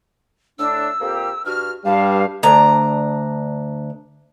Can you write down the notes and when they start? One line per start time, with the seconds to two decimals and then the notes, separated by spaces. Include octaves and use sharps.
0.59 A2 D4 E6
1.00 F2 A#3 G4
1.46 G2 F#4 F6
1.85 G2 G3 F5 A5
2.43 D2 D4 A#5